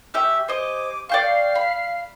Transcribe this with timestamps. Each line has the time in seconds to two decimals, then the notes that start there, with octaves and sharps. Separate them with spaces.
0.14 C#4 G4 E5
0.48 G4 C5 D#5 G#5 D6
1.09 D5 F5 G5 C#6
1.55 B5